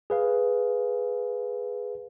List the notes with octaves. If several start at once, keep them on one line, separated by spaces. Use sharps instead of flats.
G#4 B4 F5